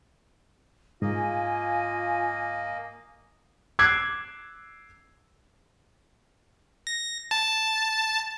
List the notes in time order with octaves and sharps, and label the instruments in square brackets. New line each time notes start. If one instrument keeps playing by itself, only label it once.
[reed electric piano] G#2 [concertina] A#3 D#5 [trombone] F4 [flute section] G#5
[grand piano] D6 E6 F#6 G#6 C7
[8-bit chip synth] A#6
A5